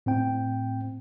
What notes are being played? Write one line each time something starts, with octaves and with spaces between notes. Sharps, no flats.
A2 C4 G5